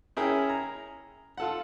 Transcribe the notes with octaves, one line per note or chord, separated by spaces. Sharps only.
C#4 E4 G#4 A#4 E5 G5
A#5
F4 A4 F#5